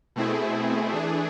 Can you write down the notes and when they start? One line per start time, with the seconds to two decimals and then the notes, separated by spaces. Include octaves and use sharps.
0.16 B2 A3 C4 E4 G#4
0.93 E3 A3 D4 G#4